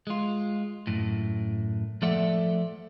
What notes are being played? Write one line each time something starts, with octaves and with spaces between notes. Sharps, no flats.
G#3 F4
F#2 A2
F3 A3 A4 D5 E5 F#5